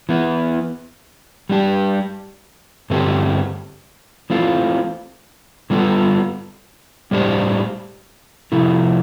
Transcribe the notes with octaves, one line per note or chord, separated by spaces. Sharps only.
E3 B3 E4
G3 D4 G4
G2 D3 A3 C4 G4
E3 A3 C4 F4
D3 G3 B3 F4 A4
A2 G3 D4 G4 C5
C3 F3 A3 E4